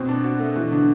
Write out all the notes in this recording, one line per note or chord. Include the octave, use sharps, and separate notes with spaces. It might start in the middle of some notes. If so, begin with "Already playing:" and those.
Already playing: B2 C4
D4
F#4
A3
B2 E3
D3 D4